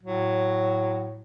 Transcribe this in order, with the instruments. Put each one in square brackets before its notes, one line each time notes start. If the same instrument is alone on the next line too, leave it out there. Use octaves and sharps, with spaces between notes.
[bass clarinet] A2 [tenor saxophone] F#3